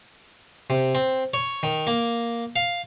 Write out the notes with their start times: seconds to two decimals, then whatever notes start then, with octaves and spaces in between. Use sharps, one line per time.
0.70 C3
0.95 C4
1.34 C#5
1.63 D#3
1.87 A#3
2.56 F5